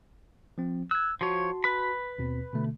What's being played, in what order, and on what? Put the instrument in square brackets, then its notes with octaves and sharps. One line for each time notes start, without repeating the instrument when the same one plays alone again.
[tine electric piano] F3 C4
[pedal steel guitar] E6 [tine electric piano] F#6 G#6
[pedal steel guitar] F3 C#5 [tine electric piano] F#4 A5 C6
[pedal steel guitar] B4 B5
[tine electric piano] D#2 B2 C4
B2 D3 A3